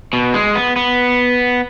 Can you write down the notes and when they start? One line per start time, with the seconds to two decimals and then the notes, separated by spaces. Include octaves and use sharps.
0.13 B2
0.34 G#3
0.55 B3
0.76 B3